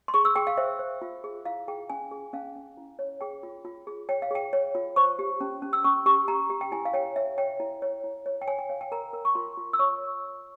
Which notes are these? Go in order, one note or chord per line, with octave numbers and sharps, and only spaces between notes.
C6
G#4 C#6
E6
G#4 G5
F5
C5 E5
C5
F4
G#4
E4 F5
G#4 G5
C#4 G#5
G#4
C#4 F5
C#4
E4
C#5
G#4 G5
F4
F4
G#4
C#5 G5
F5
G#4 G5
C#5
F4
C5 C#6
G4
C#4
C#4
E6
C#4 C#6
G4 C#6
G4 A#5
G4
G5
E4 G#5
F5
C#5 G5
C#5 E5
C#5 G5
E4
C#5
E4
C#5
G5
C#5 G#5
G5
C#5 F5
G5
A#4 A#5
A#4
C#6
F4 C6
F4
E6
C#5 C#6